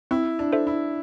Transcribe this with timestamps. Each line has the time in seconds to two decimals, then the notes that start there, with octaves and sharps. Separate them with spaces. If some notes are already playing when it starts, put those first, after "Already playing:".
0.11 C4 E4
0.39 D4
0.52 A4 C5 E5
0.67 E4